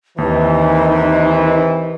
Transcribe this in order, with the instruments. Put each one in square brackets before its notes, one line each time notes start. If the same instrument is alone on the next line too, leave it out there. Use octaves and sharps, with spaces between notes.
[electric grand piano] D#2 [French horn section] C3 D#3 E3 [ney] D#4